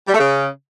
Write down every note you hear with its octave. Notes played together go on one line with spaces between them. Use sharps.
G3
A3
C#3